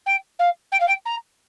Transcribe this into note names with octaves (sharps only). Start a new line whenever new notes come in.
G5
F5
G5
F5
G5
A#5